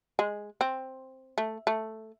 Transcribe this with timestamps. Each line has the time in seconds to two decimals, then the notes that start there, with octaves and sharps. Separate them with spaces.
0.19 G#3
0.61 C4
1.38 A3
1.67 A3